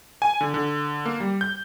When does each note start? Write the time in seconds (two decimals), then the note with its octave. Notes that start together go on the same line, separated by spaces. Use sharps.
0.22 G#5
0.41 D3
0.54 D3
1.06 A#3
1.20 G3
1.41 G6